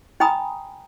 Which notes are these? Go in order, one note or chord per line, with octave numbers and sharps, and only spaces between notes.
D#4 G5 G#5 A#5 B5 D#6